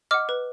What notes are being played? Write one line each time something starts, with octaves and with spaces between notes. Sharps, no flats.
D#5 F#5 D6 F6
B4